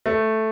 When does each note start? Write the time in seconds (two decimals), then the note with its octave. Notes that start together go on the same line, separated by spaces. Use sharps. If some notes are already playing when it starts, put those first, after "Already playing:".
0.06 A3